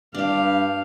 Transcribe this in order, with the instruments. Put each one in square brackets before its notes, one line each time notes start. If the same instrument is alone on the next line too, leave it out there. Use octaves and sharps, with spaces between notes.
[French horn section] G2 [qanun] D4 G4 [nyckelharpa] F5